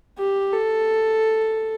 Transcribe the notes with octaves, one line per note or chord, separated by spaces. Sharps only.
G4
A4